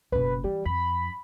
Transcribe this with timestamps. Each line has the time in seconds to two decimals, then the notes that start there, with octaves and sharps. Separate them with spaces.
0.12 F#1 B2 B4
0.44 E3 G3
0.66 F2 B5